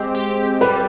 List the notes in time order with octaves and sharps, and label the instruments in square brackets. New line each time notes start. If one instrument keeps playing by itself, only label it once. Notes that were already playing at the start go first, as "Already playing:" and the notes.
Already playing: [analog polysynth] G#3 C4 G4
G4
[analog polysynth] G3 [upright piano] B4